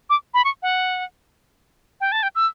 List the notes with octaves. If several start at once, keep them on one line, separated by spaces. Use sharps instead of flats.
D6
B5
C#6
F#5
G5
A5
G5
E6